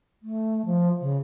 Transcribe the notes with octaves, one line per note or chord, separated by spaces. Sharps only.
A3
F3
C#3